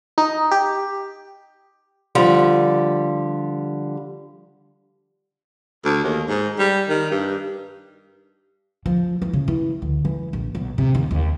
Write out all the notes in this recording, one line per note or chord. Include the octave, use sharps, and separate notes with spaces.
D#4
G4
D3 F3 G3 G4
D2
D#2
G#2
G3
D#3
G2
F3
E3
C#3
E3
D2
E3
A#1
B1
C3
D#2
D#2